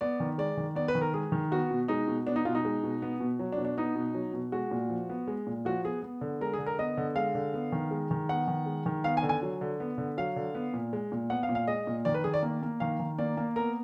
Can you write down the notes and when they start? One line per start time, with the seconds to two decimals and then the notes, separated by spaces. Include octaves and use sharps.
0.01 B3 D5
0.20 D#3
0.38 G#3 D5
0.57 D#3
0.75 B3 D5
0.88 B4
0.95 D#3
1.01 A#4
1.14 G#3 G#4
1.32 D#3
1.51 B3 F#4
1.71 B2
1.88 G#3 D#4
2.08 B2
2.27 B3 D4
2.36 D#4
2.45 B2 F4
2.55 D#4
2.65 G#3
2.83 B2
3.02 B3
3.20 B2
3.39 F#3
3.52 D4
3.58 B2
3.65 D4
3.77 B3 D#4
3.95 B2
4.14 F#3
4.34 B2
4.52 G#3 F#4
4.71 A#2
4.90 F3
5.10 B3
5.28 G#3
5.47 A#2
5.65 F3 F#4
5.84 B3 G#4
6.03 B3
6.21 D3
6.41 G#3 A#4
6.53 G#4
6.59 D3
6.66 A#4
6.78 B3 D#5
6.97 D3
7.16 G#3 F5
7.35 D3
7.54 B3
7.72 D#3
7.91 G#3
8.11 D#3
8.29 B3 F#5
8.48 D#3
8.66 G#3
8.86 D#3
9.04 B3 F5
9.17 G#5
9.23 D3
9.29 G#5
9.42 F#3
9.61 D3
9.80 B3
9.98 D3
10.17 F#3 F5
10.36 D3
10.55 B3
10.74 A#2
10.93 G#3
11.12 A#2
11.30 B3 F#5
11.43 F5
11.49 A#2
11.55 F5
11.67 G#3 D#5
11.87 A#2
12.05 D#3 D5
12.14 B4
12.24 D#3 G#4
12.34 D5
12.43 A#3
12.62 A#3
12.80 D#3 F5
13.00 D#3
13.18 A#3 D5
13.37 A#3
13.56 B3 A#4